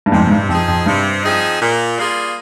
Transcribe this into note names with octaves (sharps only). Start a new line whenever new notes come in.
G2
F2 G#2 C3
G#2
G2
F2 F3 C4 D#4 G#4
F2
G2 C3
F3 C4 D#4 G#4
A#2
G3 A#3 F4 G#4